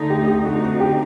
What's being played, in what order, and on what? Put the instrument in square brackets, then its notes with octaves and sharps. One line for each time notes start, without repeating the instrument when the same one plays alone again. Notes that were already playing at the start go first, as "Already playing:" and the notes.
Already playing: [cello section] D2 D3 A3 D#4
[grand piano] G4
G4
[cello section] D3 A3 C4 D#4 [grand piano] F#4
[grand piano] F#4
G4